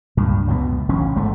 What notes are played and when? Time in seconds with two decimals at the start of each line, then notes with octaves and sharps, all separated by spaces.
0.17 C#2 G2 A#2
0.47 C#2 F#2 B2 B3
0.89 E1 A1 C#3 C#4
1.15 G#1 G#2 A3